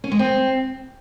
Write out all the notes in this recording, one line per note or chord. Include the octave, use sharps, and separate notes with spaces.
C#4
G#3
C4